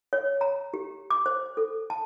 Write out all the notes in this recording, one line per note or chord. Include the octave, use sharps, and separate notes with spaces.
C#5
A#5
G4
D6
C5
A4
A5